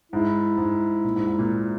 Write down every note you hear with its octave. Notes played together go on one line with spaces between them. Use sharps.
G#2 E4
G#2
A#2
G#2
G#2
A#2